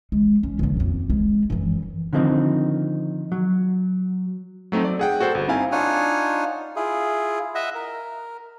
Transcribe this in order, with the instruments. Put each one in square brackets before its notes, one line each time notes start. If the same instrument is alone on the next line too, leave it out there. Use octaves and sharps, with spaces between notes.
[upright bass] G#3
C#4
D#2 C#3
F2 C3
G#3
F#2 E3
[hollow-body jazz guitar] D3 D#3 F3 C4 D#4
F#3
[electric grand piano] F#3 A3 C4 D#4
D5
G#4 F#5 G5
F#4 A4 C5 G5
G1
C4 D#4 E4 F5 G#5
[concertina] D4 D#4 F4 C#5 F#5 G#5
E4 F4 G#4
D#5 E5 F#5
A#4